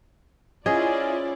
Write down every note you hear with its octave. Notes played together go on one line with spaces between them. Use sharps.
C#4 E4 F4 G#4 C5 D5 D#5